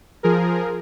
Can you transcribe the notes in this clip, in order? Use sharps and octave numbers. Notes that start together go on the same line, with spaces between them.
F3 G#4 A#4